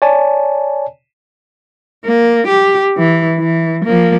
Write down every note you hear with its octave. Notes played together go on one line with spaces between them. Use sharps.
C#5 D5 G#5 A5
A#3
G4
E3
E3
F3 A#3